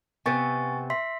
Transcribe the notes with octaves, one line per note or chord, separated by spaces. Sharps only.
C3 B3 C4 G#5 C#6 A6
E5 C6 B6